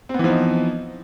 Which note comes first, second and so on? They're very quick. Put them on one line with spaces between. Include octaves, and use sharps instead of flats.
C4 B3 E3 F3 D#4